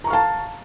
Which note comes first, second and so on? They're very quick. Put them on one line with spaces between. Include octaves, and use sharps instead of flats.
A#5 C#6 F5 A5